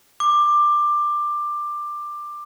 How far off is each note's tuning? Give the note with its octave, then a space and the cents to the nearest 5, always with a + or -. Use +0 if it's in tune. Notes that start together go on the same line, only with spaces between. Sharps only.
D6 +15